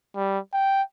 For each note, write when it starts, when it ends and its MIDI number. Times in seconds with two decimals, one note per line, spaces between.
0.16 0.39 55
0.53 0.82 79